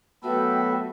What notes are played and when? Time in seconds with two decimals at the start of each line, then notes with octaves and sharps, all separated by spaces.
0.23 F#3 A3 B3 F#4 A4 B4 E5 G5